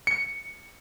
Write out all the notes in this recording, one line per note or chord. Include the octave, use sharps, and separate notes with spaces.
C#7